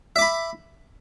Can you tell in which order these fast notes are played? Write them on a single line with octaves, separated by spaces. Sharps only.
E5 D6 B5